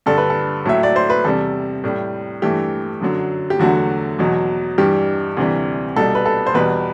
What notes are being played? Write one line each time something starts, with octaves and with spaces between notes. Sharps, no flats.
G2 D3 G3 A4
B4
A4
A2 F#3 A3 E5
D5
C5
B4
E2 C3 G3 A4
A2 G3
G2 E3 A3 G4
F#2 D3 F#3
G4
E2 D3 F#3 A3 F#4
E2 B2 F#3
G2 E3 G3 G4
D2 C3 E3 G3
C2 B2 G3 A4
B4
A4
C5
E2 B2 G3 B4